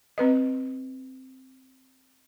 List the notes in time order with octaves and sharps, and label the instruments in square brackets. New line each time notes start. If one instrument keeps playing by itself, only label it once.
[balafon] C4 B4 D#5